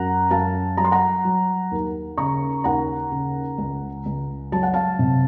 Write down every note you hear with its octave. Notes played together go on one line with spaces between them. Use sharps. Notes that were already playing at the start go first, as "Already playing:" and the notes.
Already playing: F#2 F#5 A#5
F#2 F5 A5
F#3 A#5
C6
F#5 A#5
F#3
D#2
C#3 A#5 C#6
D#2 F#5 A#5
C#3
C#2
C#2
F#3 A5
F#5
F5 A5
C3